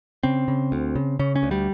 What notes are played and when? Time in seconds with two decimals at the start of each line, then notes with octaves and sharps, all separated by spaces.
0.23 C#3 C4
0.48 C#3
0.72 D2
0.95 C#3
1.19 C#3 C#4
1.36 C#4
1.43 D2
1.51 G3